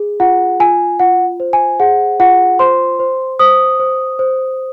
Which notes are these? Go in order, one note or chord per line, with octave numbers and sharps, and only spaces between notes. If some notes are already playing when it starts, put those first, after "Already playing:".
Already playing: G#4
F4 F#5
F4 G#5
F4 F#5
C5
G#5
G#4 F#5
F4 F#5
C5 C6
C5
C5 D#6
C5
C5